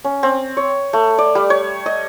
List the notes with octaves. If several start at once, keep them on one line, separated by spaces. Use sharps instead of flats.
C#4
C4
C#5
A3
D5
G3
C#5
D#5